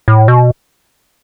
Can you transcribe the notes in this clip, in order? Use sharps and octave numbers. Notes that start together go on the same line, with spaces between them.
A2
B2